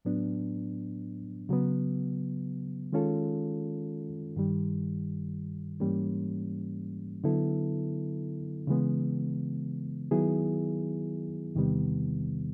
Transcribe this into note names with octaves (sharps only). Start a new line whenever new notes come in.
A2 F#3 B3 D4
C#3 F#3 B3
D#3 G#3 C#4 F4 A4
G2 D#3 G3
G#2 E3 G3 A#3 C#4
D3 F#3 B3 E4 A4
C#3 E3 G#3 B3
D#3 F#3 B3 E4 G#4
E2 C3 D#3 G3 B3